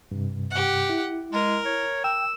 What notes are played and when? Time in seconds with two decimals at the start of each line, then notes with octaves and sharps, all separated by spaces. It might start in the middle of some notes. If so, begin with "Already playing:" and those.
0.11 G2 C3
0.51 G4 F#5
0.89 E4
1.33 G#3 A#4
1.65 C#5
2.04 G5 E6